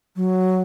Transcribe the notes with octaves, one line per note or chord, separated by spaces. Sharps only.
F#3